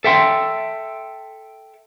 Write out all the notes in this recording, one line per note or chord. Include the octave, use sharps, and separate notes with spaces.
A4 E5 G5 C6